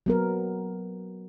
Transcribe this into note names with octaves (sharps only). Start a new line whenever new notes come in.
F#3 B3 A#4